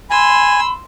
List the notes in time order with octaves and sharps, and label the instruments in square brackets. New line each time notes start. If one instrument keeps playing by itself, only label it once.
[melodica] G#5 [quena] B5 [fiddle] C6 E6